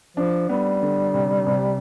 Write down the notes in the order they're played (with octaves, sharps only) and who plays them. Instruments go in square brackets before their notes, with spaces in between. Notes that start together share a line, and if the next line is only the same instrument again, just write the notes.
[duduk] F3 [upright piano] D4
[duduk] G3 [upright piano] B3
[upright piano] D3
C3
C3